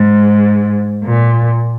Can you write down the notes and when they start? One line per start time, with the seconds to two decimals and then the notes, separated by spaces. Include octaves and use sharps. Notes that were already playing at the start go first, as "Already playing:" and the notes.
Already playing: G#2
1.04 A#2